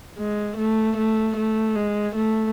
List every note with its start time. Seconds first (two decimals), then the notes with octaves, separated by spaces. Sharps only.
0.18 G#3
0.57 A3
0.97 A3
1.37 A3
1.76 G#3
2.16 A3